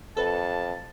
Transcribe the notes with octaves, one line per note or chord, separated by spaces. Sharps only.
F2 A4 B4 A5